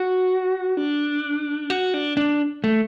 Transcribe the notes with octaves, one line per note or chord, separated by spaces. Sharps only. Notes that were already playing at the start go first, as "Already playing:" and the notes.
Already playing: F#4
D4
F#4
D4
D4
A3